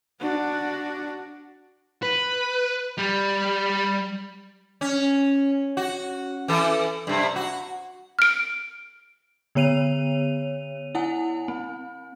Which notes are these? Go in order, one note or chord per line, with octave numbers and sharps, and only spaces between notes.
D4 F#4
B4
G3 G4
C#4
F#4
E3 A4
G2 C3
F#4
F6 D7
D3 B3 C#5 D#7 F7
E4 F#5 G#5
C4